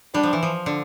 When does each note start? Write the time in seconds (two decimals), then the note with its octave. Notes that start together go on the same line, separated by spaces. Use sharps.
0.14 G3 D4
0.23 F3
0.33 E3
0.43 F3
0.66 D3